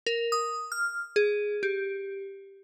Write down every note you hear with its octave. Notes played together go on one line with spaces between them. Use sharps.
A#4
D#6
F6
G#4
G4